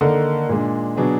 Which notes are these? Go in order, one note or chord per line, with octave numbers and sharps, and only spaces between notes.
D3 D#3 A#3 D#4 A#4
A#2 G#3 D4
B2 F#3 D4 G#4